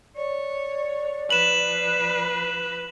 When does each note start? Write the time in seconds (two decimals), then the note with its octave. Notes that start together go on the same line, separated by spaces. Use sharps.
0.16 C#5 D5
1.30 F3 B4 E7 F#7